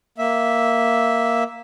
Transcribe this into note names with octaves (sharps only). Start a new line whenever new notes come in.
A#3 E5